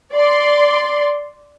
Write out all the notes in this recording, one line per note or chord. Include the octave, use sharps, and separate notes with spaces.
D5 C6